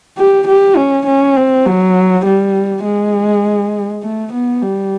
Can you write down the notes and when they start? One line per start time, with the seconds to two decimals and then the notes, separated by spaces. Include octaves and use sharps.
0.17 G4
0.47 G4
0.76 C#4
1.07 C#4
1.36 C4
1.66 F#3
2.25 G3
2.84 G#3
4.03 A3
4.32 B3
4.62 G3